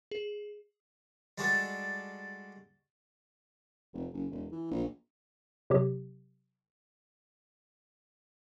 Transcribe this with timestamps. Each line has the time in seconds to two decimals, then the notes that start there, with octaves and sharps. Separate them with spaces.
0.11 G#4
1.38 G3 G#3 D4 F#4 A4
3.93 F1
4.13 F#1
4.31 E1
4.52 E3
4.71 A#1
5.70 C3 F#3 G4